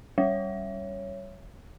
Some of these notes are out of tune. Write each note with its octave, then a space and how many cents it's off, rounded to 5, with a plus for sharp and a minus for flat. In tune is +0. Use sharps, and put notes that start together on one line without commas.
G3 -10 C#5 +0